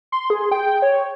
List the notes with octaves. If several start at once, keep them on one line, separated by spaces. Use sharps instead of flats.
C6
G#4
G5
C#5